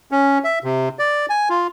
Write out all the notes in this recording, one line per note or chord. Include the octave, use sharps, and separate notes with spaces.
C#4
E5
C3
D5
G#5
F4